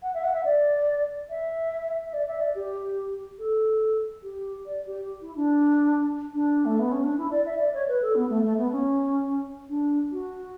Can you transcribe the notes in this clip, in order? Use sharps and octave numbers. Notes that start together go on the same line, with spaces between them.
F#5
E5
F#5
E5
D5
E5
E5
D5
E5
D5
G4
A4
G4
D5
G4
E4
D4
D4
A3
B3
C#4
D4
E4
D5
E5
D5
C#5
B4
A4
B3
A3
A3
B3
C#4
D4
F#4